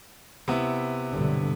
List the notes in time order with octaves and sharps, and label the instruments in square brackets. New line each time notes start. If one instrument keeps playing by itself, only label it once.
[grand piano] C3 B3 E4
[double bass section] B1 G2 D3